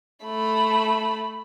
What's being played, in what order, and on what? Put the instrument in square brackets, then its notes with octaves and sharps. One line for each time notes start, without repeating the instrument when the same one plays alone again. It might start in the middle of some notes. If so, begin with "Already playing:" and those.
[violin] A3 B5